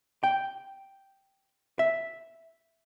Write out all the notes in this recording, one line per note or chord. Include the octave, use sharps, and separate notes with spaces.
G5
E5